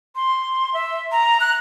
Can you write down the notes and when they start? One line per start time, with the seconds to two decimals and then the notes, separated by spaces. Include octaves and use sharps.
0.16 C6
0.74 E5
1.12 A#5
1.40 F#6